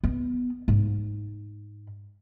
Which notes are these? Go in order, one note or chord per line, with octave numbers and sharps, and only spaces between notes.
B3
G#2